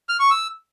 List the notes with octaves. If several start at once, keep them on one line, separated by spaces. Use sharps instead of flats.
F6
C#6
E6